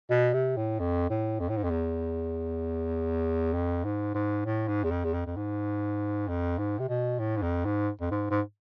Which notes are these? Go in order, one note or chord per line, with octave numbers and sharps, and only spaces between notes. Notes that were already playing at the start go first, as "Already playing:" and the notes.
B2
C3
A2
F2
A2
F2
A2
G#2
F2
E2
F2
G#2
G#2
A2
G#2
E2
F2
E2
F2
F2
G#2
F2
G#2
C3
B2
A2
G#2
F2
G#2
F2
G#2
G#2